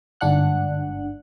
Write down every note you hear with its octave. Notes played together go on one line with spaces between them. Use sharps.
G1 G#2 D4 F#5 F#6